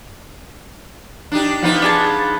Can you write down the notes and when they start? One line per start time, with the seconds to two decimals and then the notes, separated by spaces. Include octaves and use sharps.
1.32 D4 D#4 G4
1.62 F3 B3 D#4
1.82 D4 G#4 A5